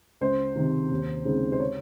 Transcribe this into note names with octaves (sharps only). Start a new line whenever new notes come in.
C#2 C5
C3 D#3
D#2
C#3 G#3 C4 D#4
C5
C#5